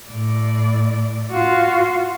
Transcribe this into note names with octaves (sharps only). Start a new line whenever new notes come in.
A2 D5
F4 F#4